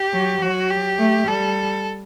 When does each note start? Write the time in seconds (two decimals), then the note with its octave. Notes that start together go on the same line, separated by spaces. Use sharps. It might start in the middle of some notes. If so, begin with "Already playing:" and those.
Already playing: G4
0.13 F#3
0.41 F#3 F#4
0.70 G4
0.99 A3
1.28 G3 A4